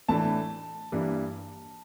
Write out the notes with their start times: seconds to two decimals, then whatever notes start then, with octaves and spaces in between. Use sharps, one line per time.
0.09 A2 E3 A3 D4 A5
0.92 G2 E3 G3 A#3 D4